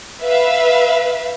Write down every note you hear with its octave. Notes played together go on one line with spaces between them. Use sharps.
B4 E5 F5